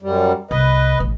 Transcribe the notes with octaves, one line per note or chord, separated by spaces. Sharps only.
F#2 G3
C2 B4 D#5
A1